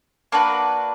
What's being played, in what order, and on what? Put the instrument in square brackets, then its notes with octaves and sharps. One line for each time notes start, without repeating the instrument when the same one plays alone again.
[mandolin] A#3 D4 F#4 B4